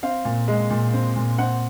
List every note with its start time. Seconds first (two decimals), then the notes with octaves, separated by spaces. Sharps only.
0.03 C4 F5
0.25 A#2
0.48 G#3
0.70 A#2
0.93 C4
1.16 A#2
1.38 C4 F#5